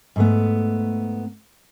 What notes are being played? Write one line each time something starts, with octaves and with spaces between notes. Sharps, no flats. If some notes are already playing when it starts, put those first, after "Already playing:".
G#2 A3 B3